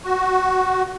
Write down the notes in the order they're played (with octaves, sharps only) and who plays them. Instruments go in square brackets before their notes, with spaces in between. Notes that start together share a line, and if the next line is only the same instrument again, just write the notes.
[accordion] F#4